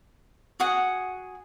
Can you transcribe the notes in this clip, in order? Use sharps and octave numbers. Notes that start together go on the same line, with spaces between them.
F#4 G#4 F#5